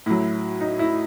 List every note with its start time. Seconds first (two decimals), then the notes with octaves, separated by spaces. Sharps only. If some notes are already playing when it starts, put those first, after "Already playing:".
0.06 A2 F#3 E4
0.61 D#4
0.79 E4